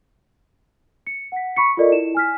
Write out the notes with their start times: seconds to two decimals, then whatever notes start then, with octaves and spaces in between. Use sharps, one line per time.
1.07 C#7
1.32 F#5 B6
1.56 B5 C#6 B6 C#7
1.77 F4 A4 A#4 D5 D#5
1.92 E4 E7
2.15 G#5 F6 B6